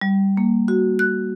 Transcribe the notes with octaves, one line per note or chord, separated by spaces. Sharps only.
G3
A#3
F#4
F#6